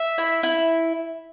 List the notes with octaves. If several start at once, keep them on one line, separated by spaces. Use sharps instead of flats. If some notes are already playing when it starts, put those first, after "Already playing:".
Already playing: E5
E4
E4